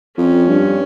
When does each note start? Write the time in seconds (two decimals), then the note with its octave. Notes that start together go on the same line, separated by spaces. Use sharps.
0.18 F2 C#4
0.48 G2